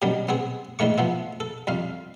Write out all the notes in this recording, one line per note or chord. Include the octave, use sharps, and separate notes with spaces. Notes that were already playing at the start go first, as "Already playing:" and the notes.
B2 D#3 F#3 G3 C#4
B3 C4 G#4
E2 G#2 D#3 A3 C#6
F3 B3 E4
A4
C2 F2 F5